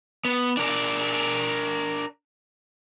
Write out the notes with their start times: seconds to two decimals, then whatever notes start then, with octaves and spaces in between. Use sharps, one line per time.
0.25 B3
0.57 D4 A#4 D5